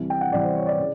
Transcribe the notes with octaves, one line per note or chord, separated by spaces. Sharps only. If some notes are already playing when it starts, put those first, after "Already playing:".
Already playing: C2 C3 E3
G5
F#5
C2 C3 E3 D5
C5
C#5
D5
C#3